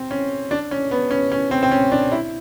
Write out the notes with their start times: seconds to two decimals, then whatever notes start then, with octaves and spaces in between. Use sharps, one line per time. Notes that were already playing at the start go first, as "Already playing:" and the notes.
Already playing: C4
0.11 C#4
0.51 D4
0.71 C#4
0.91 B3
1.11 C#4
1.32 C#4
1.51 C4
1.63 C4
1.71 C#4
1.92 D4
2.12 E4